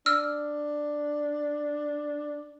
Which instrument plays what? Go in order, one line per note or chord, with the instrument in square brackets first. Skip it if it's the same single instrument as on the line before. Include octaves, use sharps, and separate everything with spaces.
[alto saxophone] D4 [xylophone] E6 F6